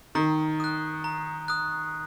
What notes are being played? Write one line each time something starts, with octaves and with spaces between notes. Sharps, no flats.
D#3 A#5
D#6 F#6
A#5
D#6 F#6